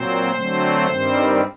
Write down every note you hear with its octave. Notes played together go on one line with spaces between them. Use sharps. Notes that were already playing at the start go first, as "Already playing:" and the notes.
Already playing: A#2 F#3 C4 C5
D3 F#3 A3 C4
G2 D#3 G3 C4